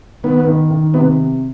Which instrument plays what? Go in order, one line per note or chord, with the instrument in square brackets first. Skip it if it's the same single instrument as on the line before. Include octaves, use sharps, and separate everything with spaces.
[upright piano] D#3 [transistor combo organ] B3
[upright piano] D#3
D#3
[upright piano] C3 [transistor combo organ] B3